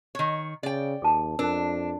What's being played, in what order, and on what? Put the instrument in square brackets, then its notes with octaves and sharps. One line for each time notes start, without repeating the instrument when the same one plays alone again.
[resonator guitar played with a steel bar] D#3 C#5
[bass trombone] C#3 [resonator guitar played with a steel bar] D5 G5
[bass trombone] D#2 [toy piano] G#4 A4 A5
[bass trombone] F2 [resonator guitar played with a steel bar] D4 [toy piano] A#4